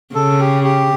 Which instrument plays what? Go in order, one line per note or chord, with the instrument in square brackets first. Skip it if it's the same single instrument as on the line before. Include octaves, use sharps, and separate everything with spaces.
[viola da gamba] C#3 [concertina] A4
[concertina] G4
G4